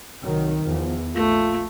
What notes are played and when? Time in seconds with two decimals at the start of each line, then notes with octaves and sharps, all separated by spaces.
0.24 C2 D#3 F#3
0.66 E2 F3
1.15 A#1 A3 F4